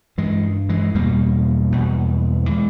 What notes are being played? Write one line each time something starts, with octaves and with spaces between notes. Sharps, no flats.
G2 E3 G#3
E3 G#3
E2 B2 G3 A#3
E2 B2
E3 G#3